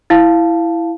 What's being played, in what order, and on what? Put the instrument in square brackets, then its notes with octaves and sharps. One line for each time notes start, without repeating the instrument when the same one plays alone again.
[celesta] E4 F5 A5